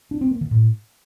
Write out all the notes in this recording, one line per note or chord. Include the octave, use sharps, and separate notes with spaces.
D4
C4
A#3
D#3
A2